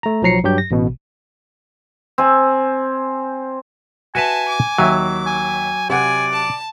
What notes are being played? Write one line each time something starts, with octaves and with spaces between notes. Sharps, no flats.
A3 A#5
B1 F3 F#3 A#5 C7 C#7
G2 F#3 G4 G6
A#6
A1 B2
C4 G#5
F#4 B4 E5 G#5 A5
D6
D#2 F#3 E5
G#5
C3 D5 F#5 G#5
A5